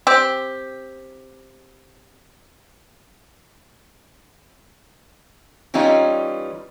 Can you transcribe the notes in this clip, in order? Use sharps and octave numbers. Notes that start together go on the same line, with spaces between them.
C4 G4
E3 G3 C#4 D#4 F4